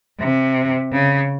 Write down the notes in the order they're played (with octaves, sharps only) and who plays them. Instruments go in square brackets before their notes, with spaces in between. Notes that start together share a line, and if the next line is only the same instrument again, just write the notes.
[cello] C3
C#3